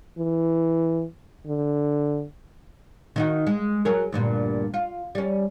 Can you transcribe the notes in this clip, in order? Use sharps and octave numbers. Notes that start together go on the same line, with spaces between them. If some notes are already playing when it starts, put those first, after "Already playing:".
E3
D3
D#3 D#4 F#4
G#3
F#3 G#4 A#4
D2 G2 A#2
F4
G3 C#4